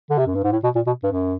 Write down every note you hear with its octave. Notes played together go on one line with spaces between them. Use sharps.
D3
C3
F#2
G2
G#2
A2
B2
A#2
B2
G2
F#2